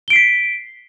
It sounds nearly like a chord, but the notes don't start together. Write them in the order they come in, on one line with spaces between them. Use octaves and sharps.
G7 D7 C7 B6